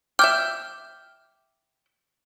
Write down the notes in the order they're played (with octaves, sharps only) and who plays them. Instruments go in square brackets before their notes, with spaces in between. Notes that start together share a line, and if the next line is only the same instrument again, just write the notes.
[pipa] E5 G5 [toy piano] D6 [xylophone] F6 G6